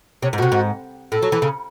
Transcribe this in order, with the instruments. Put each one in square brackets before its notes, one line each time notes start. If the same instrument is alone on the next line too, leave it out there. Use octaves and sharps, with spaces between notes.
[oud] C3 [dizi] C#5
[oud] G#2
[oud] A2 [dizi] F#4
[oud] C3
G#2
[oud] A2 [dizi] A4
[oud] F#3
E3
C#3